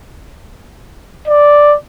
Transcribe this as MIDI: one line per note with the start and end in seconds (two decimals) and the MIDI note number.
1.28 1.74 74